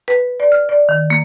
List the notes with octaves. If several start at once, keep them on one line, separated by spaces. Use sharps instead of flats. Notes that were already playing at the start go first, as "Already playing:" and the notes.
B4
D5
F6
D5
D#3
A#3